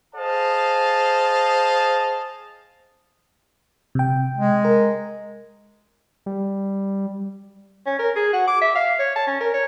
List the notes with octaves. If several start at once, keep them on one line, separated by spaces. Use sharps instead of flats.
G#4 C5 D#5 F5 A5
C3 G5
G#3
A#4
G3
C#4
A#4
G#4
F#4
D6
E5
F5
C#5
A5
C#4
A#4
C#5